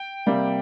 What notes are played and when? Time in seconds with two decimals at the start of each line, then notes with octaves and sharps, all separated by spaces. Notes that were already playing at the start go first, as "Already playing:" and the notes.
Already playing: G5
0.26 C3 G3 A#3